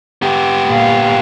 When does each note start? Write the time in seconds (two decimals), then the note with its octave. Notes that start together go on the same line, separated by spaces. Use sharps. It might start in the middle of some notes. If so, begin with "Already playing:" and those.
0.22 B3 G4
0.67 A#2 F5